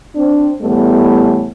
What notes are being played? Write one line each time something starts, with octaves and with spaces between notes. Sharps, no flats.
C4 D4
E2 A2 G3 A3 B3